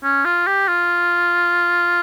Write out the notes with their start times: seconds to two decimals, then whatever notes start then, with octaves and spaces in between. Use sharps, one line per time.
0.03 C#4
0.25 F4
0.47 G4
0.68 F4